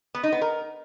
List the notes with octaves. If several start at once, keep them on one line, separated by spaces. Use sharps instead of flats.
B3
D#4
B3
A#4